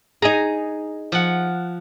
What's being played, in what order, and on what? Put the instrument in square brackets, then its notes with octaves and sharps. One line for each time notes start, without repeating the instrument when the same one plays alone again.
[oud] D#4 G#4 [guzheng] G#5 A#5
[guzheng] F3 F#5